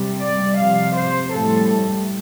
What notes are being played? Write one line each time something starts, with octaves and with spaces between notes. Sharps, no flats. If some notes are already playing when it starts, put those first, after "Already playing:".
Already playing: C3 G3
D5
C3 F3 F5
C5
A2 G3 A4